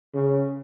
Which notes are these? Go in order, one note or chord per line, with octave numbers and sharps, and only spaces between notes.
C#3